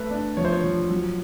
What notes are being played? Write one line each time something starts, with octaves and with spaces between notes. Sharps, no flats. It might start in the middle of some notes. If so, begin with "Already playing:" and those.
Already playing: A3 B4
D4
F3 C#5
C5
C#5
F3
F#3